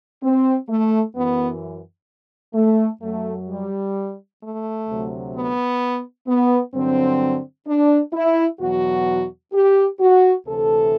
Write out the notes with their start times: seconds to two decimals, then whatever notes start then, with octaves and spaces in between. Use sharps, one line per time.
0.23 C4
0.69 A3
1.15 F#2 E3 B3
2.54 A3
3.02 F#2 F#3 A3
3.48 G3
4.41 A3
4.88 D2 C3 F#3
5.34 B3
6.27 B3
6.73 G2 D3 F#3 C4
7.67 D4
8.13 E4
8.60 E2 B2 F#3 F#4
9.53 G4
10.00 F#4
10.47 D2 C3 E3 A4